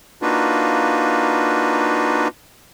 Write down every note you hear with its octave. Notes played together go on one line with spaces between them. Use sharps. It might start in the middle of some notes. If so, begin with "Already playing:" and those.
A#3 D4 D#4 F4 F#4 B4